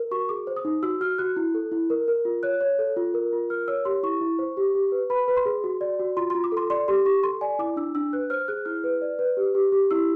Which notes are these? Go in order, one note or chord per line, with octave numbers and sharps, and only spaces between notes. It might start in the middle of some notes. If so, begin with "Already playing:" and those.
Already playing: A#4
F#4 C#6
G#4 D6
C5
D#6
D#4
F#4 E6
F#4 F6
F#4 F#6
E4
A4
E4
A#4
A#4
F4
C#5 F#6
C#5
A4
F4
A#4
F4
A#4 F6
C#5 E6
G4 C6
E4 C#6
E4
C5
G4
G4
B4
B4 B5
B4
C6
G#4
F#4
D5
F#4
F4 C6
F4 C6
D6
A4 C6
D5 C6
G4 C6
G4 C#6
A4 C6
D5 G#5
E4 D6
D4 E6
D4 E6
B4 F#6
C5 F6
G#4 F#6
E4 F6
B4
D5
B4
G4
G4
G4
E4 E6